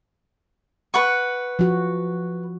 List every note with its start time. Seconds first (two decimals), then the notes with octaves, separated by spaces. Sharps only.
0.94 B4 F#5 C#6
1.59 F3 F#4